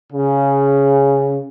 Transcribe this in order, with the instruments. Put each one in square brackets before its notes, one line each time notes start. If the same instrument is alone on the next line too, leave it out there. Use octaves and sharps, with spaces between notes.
[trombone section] C#3